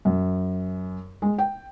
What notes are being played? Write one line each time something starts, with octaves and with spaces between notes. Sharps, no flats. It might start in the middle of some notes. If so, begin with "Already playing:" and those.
F#2
G#3
G5